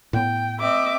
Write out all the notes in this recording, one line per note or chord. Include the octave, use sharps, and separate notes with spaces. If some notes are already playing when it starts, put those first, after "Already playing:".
A2 B3 G5
C4 D#5 E5 D6